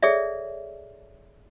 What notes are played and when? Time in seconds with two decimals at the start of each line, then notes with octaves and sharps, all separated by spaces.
0.03 G#4 A4 C#5 D5 E5